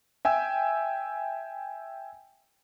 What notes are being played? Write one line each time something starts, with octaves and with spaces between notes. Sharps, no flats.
E5 G5 G#5 E6